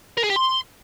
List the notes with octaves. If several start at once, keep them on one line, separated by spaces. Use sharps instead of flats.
A#4
G#4
G4
C6